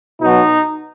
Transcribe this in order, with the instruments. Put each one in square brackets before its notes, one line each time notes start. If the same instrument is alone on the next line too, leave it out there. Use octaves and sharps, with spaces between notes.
[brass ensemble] B2 F#3 D#4